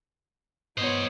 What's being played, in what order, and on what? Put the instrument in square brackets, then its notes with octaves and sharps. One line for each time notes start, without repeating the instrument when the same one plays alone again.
[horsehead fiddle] B3 C#5 [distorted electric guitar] C5 D#5